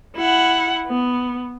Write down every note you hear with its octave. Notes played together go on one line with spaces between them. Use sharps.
E4 F#5
B3